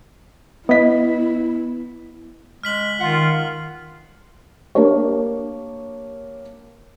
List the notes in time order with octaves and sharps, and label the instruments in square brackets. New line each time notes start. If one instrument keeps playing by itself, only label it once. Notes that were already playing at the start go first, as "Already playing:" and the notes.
[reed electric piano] B3 [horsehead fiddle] E4 [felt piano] D#5 B6
[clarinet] G#3 [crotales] F6 B6 F#7
[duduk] D#3 [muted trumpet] F4 [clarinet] F#5
[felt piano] A#3 D4 G4 A#4 C#5